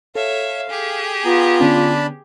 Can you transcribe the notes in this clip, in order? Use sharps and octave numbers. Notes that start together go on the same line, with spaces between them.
A4 C#5 E5 F5
G4 G#4
B3 F4 A#5
D3 B3 C#4 D4 A5 B5